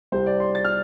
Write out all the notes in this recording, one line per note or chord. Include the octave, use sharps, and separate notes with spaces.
C2 C3 G3 C4 C5
D5
C6
A6
F6